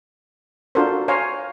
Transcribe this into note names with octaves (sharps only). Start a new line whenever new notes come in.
D4 F4 F#4 A4 A#4 C5
C5 C#5 F5 G#5 A#5